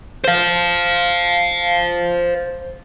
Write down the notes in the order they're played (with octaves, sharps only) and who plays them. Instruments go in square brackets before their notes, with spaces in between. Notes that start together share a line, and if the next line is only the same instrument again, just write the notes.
[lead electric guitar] C5 F5